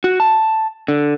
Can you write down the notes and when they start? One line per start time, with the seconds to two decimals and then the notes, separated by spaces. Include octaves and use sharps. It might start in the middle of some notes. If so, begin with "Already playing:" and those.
0.04 F#4
0.20 A5
0.88 D3